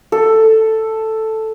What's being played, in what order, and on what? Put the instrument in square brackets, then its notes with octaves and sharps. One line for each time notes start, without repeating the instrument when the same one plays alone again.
[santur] A4